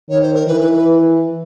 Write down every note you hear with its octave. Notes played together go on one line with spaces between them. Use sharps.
D#3 C#5
C5
A#4
E3 B4
B4
B4